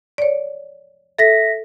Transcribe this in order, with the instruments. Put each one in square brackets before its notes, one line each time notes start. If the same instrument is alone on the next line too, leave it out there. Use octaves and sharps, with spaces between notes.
[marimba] C#5 D5
[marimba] A4 [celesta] E5 A#6 B6